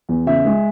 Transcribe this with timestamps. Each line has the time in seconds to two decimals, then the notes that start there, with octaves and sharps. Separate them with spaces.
0.09 E2
0.27 C#3 E5
0.45 G#3